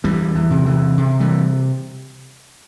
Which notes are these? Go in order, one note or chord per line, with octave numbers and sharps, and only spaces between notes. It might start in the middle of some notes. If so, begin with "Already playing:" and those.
E2 E3 G3
E3
C3
E3
C3
E3 G3